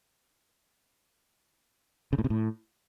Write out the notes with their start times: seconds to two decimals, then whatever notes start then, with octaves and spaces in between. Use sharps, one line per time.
2.13 C#3
2.18 A2
2.24 C3
2.30 A2